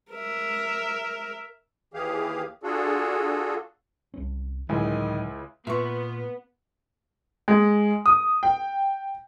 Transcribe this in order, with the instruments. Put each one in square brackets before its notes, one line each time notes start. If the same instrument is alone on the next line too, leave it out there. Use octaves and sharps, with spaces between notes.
[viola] A#4 E5
[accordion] D#2 E3 G4 G#4 F5
D4 F4 F#4 G#4 A4
[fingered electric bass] C2 C#4
[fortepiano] C#2 E4 G#5 [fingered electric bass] A2 D3 F#3 [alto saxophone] D#3
[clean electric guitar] A#2 [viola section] B3 [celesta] F4 C6 [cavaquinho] E5 C#6
[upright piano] G#3
D#6
G5